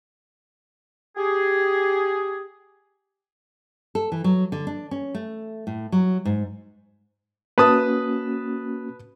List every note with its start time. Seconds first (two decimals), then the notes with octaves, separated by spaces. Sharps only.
1.17 G4 G#4
3.95 A4
4.12 E3
4.24 F#3
4.52 D3
4.67 D4
4.91 C#4
5.14 A3
5.67 A2
5.92 F#3
6.25 G#2
7.58 A#3 C#4 F#4 B4 A5 D#6